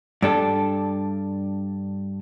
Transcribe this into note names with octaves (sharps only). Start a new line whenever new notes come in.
G2 D4 A4